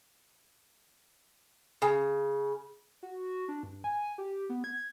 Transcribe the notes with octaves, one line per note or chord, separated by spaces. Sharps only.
C#3
F#4
D4
G2
G#5
G4
B3
G#6